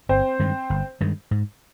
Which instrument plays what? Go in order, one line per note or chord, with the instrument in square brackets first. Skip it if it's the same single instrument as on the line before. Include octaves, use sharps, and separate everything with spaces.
[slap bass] G1 [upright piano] C4 C5
[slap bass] G2 D#3 G#3
G1
G2 D#3 G#3
G#2